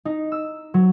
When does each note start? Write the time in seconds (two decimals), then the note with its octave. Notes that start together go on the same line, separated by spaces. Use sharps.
0.05 D#4
0.32 E6
0.74 F#3